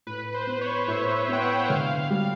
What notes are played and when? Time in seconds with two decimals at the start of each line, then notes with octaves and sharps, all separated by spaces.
0.07 A2 B4
0.34 C5
0.47 B3
0.61 C#5
0.88 A2 E5
1.28 B3 G5
1.42 F#5
1.70 D3 F5
2.10 G3